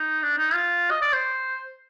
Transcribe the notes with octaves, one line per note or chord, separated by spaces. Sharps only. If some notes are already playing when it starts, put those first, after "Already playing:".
Already playing: D#4
D4
D#4
F4
D#5
D5
C5